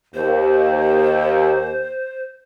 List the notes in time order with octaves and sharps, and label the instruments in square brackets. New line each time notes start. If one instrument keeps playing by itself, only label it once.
[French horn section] D#2 [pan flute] C5